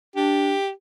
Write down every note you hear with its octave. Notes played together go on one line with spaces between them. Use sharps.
D4 G4